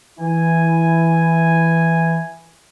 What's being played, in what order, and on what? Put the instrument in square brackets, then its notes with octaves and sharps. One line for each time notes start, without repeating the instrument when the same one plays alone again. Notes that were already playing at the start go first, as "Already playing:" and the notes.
[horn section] E3 E4 G#5